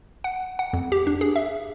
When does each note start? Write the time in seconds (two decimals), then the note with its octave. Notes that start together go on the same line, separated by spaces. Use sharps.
0.24 F#5
0.59 F#5
0.73 F2
0.92 G4
1.07 D4
1.21 G#4
1.36 E5